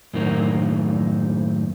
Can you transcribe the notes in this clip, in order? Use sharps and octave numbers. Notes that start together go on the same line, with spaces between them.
F#2 A2 D#3 A#3 C4